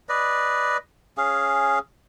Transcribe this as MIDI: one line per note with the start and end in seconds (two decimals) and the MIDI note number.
0.09 0.77 71
0.09 0.77 74
0.09 0.77 75
1.18 1.79 61
1.18 1.79 68
1.18 1.79 77